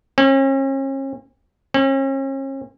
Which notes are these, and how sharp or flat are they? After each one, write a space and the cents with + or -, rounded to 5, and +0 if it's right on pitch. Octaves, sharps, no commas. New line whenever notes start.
C#4 -40
C#4 -40